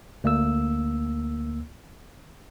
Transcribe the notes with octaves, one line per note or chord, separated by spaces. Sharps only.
D2 A#3 E6